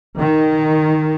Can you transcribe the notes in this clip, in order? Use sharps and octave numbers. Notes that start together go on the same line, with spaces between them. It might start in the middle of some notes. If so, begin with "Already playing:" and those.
D#3